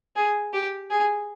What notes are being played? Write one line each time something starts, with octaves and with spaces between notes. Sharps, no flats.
G#4
G4
G#4